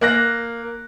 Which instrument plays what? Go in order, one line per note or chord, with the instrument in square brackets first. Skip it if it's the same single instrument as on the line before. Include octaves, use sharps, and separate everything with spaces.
[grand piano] A#3 F#6 A#6